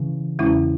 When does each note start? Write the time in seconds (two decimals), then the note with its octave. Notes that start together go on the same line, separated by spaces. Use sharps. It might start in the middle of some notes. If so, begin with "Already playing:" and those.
Already playing: C#3 E3
0.39 E2 C#3 G#3 C#4 E4